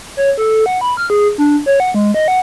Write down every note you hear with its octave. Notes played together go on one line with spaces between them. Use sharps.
C#5
A4
F#5
B5
F6
G#4
D4
C#5
F#5
G#3
D#5
F#5